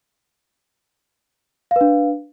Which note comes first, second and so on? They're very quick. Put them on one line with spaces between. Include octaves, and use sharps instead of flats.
F5 B4 D4